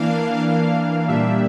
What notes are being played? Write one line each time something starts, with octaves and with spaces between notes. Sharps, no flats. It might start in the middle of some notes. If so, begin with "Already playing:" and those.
Already playing: E3 A#3 D4 F5
A#2 G3 A#3 D4 E5